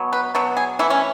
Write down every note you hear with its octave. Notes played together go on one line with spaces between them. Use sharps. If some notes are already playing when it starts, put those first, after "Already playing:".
Already playing: B2 F#3 B3
B4
B2 F#3 B3
G#4
E3 A3 E4
C#4